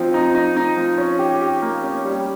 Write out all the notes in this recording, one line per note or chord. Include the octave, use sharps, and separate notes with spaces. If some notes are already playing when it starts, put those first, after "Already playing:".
Already playing: F3 C4 D#4
D#4
D#4
D#4
F3
C#4
G4
G4
A#3
C#4
G3